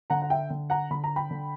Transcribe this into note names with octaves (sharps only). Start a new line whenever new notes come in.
D3 F#5 A#5
F#5
E5 G5
D3
F#5 A#5
D3 B5
A#5
G5 B5
D3